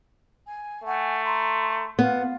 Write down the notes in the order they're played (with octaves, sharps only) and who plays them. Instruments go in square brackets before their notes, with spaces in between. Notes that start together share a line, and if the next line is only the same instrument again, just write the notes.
[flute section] G#5
[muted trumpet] A3 [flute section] F#5 G#5
[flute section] A#5 C6
[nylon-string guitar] B3 [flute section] F4